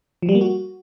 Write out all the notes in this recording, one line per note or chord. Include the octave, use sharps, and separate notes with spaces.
F3
G3
A#3
F#4